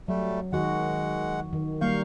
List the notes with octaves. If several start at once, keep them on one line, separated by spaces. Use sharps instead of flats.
F#3 G3 A3
D#3 G#3 F#4 F#5
D#3
G3 A#3 F5 C#6 G6